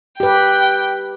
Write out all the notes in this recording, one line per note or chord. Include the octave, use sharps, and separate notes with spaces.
G4 B4 G5